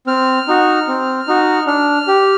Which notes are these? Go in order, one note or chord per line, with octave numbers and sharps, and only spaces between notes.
C4 F6
D#4 F#4
C4
D#4 F#4
D4 F6
G4